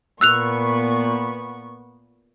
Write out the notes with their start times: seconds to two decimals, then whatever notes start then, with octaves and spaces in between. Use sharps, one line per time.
0.21 A#2 B3 C#6 E6 F#6 F7